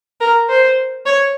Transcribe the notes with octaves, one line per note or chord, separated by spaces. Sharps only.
A#4
C5
C#5